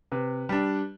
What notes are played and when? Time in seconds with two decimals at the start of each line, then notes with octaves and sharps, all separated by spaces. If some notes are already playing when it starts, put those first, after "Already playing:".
0.12 C3 B4
0.49 G3 D4